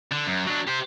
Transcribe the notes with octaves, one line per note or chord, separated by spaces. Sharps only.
D3
F#2
F#3 D4
G4 C5